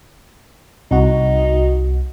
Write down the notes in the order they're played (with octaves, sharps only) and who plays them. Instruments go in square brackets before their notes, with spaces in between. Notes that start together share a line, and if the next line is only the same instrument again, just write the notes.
[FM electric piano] C2 F#4 [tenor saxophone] D#4